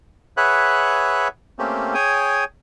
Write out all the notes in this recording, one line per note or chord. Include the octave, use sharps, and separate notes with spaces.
G#4 B4 C#5 E5 F#5 F#6
A3 A#3 C4 C#4 G4
G#4 C#5 G5 G#5 D#6